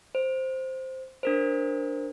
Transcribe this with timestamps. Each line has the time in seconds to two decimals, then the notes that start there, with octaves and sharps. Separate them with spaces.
0.15 C5
1.23 D4 A#4 C5